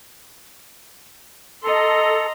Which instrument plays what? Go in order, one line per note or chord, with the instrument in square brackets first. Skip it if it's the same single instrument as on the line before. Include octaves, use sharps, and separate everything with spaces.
[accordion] A4 [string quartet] D#5 A#5 C6